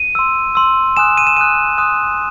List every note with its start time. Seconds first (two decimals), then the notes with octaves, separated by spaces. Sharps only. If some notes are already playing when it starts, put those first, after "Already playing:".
Already playing: D#7
0.15 C6 E6
0.55 C6 E6
0.97 G#5 D#6 F#6 E7
1.17 D#7
1.27 E7
1.37 G#5 D#6 F#6 D#7
1.78 C6 D#6 F#6